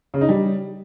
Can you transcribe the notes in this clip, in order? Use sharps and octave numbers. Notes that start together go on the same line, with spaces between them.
C#3
D#4
G3